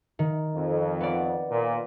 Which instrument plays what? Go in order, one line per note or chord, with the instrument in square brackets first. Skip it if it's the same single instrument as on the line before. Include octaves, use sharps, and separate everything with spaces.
[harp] D#3
[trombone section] F2
[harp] B3 D5
[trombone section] A#2